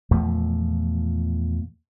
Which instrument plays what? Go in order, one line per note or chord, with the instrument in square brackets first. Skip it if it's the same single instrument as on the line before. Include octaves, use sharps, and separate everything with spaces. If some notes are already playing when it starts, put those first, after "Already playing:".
[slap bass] E2 A#2 F3 A3